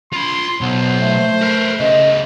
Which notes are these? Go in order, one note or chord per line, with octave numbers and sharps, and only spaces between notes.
F4 B5 C6
B1 B3 C5
A3
A#4 B4
C#3 B3 D#5